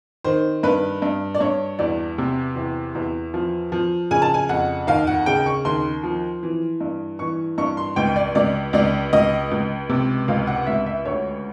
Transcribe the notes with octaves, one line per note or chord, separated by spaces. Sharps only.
D#3 C5
G2 B4
G2
D5
G2 C#5
E2 D5
C3
E2
E2
F3
F3
C#3 G#5
A5
G#5
F2 F#5
D#2 F5
F#5
C#3 G5
C#6
D#2 C6
F3
E3
G2
E3 C#6
G2 C#6
C6
C#2 G5
D5
C#2 D5
C#2 D5
C#2 D#5
C#2
C3
C#2 F5
F#5
C#2 E5
E5
D2 C#5